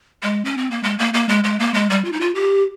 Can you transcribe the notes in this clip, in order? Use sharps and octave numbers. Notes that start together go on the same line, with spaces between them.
G#3
C#4
C4
A#3
G#3
A#3
A#3
G#3
G#3
A#3
G#3
G3
F4
D#4
F4
G4